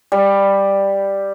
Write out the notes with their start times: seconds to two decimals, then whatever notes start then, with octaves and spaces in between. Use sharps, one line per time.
0.12 G3